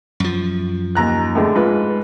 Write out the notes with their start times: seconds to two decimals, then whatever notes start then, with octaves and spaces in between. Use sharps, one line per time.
0.20 F#2 F3
0.95 D#2 A#5 F#6
1.35 A2 D3 G#3
1.56 G#2 F4 B4